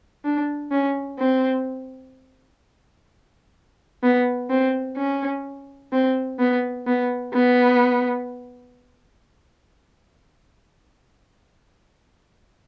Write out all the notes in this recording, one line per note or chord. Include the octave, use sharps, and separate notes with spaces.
D4
C#4
C4
B3
C4
C#4
C4
B3
B3
B3